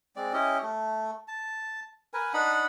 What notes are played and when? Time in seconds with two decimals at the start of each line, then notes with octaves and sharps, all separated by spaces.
0.16 G#3 C4 D5
0.33 C#4 E4 G4 D#5
0.62 A3
1.28 A5
2.14 A#4 B4 G#5
2.33 D4 D#4 F#5 B5